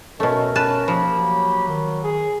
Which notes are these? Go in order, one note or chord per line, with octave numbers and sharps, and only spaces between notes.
B2 A3 C#4 A#4
C#4 B4 A5
F3 A#3 G4 B5
F#3
D#3
G#4